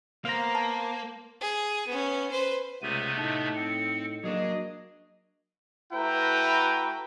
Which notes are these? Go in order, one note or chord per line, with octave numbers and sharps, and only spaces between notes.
A#3 B3 C5 F5 A#5
A5
G#4
B3 C#4
B4 C5
C#2 C3 A3 B3 D#7
A2 D#4 A5
C4 C#7
F#3 A#3 D4 G#4 D#5
A3 E4 F#4 B4 G5 A#5